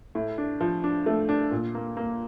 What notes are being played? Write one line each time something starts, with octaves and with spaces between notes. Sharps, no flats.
A2
D4
F3
D4
A3
D4
A#2
A#3
A#3